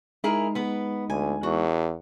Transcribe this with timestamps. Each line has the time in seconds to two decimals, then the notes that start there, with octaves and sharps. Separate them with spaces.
0.24 G#3 D#4 E4 G#4 A#4
0.55 B3 B4
1.10 D2 G#5
1.43 E2 F#4